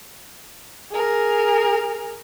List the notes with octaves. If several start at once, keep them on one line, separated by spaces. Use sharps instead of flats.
G#4 A#4